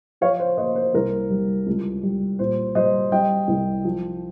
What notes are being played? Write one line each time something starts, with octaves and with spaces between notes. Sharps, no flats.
F3 C#5 F5
C5
A#3 C5 D#5
C5
C2 A#4
G3
C#2
G3
A#2 C5
G3 C5 D#5
G3 D#5 G5
C2
F3